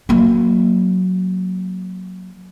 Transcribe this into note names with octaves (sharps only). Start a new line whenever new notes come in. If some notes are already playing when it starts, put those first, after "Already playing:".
F#3 A#3